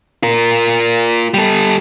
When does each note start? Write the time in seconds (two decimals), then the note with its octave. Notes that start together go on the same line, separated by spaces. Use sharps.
0.23 F4 A#4
1.34 G3 A4